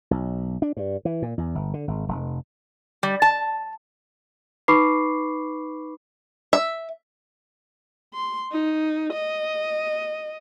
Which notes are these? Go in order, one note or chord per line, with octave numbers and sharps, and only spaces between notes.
B1
D4
G2
E3
A#2
E2
G1
D3
G#1
F1
G3
A5
D#4 B4 B5 C#6 D6 C7
E5
C6
D#4
D#5